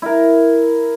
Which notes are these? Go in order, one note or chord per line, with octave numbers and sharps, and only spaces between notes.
E4 A#4